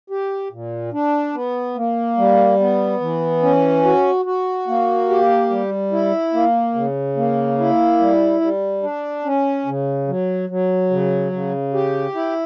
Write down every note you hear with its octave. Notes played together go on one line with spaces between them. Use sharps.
G4
A#2
D4
B3
A#3
G3
B3
E3
C#4
F#4
F#4
A#3
G4
G3
E4
A#3
C#3
A#3
E4
G3
G3
D4
C#4
C#3
F#3
F#3
C#3
C#3
G4
E4